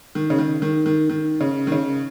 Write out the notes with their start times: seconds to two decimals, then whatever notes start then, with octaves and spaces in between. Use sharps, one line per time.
0.15 D#3
0.30 C#3
0.39 D#3
0.62 D#3
0.86 D#3
1.10 D#3
1.40 C#3
1.67 D#3
1.72 C#3